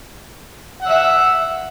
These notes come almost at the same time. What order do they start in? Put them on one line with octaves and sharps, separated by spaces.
F#5 E6 E5